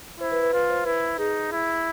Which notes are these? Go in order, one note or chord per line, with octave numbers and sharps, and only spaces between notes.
E4 C5
B4
B4
F4 B4
C5
E4 B4
D#4 G#4
E4